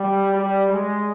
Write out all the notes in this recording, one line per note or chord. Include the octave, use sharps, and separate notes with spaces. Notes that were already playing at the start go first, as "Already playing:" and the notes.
Already playing: G3
G3
G#3